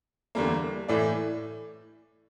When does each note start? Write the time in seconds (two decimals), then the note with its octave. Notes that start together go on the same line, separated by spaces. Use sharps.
0.35 E2 D3 G3 A#3
0.88 A2 E3 A3 D5